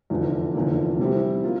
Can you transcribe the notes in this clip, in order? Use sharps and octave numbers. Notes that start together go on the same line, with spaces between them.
F1 E2 D3 F3
F1 E2 D3 F3 A#3
C3 G3 C4 E4
A#3 F4